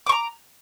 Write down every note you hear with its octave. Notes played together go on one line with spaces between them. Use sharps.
A#5 C#6 D6